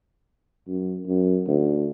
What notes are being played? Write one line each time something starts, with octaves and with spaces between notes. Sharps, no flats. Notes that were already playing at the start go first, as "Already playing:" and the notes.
F#2
F#2
D2